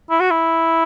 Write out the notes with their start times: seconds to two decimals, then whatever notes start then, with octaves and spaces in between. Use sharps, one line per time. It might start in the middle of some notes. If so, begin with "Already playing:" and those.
0.10 E4
0.21 F#4
0.31 E4